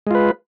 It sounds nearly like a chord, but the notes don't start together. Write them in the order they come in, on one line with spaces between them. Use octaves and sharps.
G#3 F4 B4